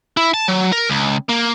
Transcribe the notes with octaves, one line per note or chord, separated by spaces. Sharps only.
E4
A5
F#3
A#4
C#2
A#3